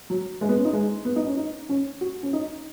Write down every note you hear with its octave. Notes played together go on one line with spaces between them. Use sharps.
F#3
G#3
B3
C#4
D#4
G#3
B3
D#4
C#4
D#4
C#4
F#4
C#4
D#4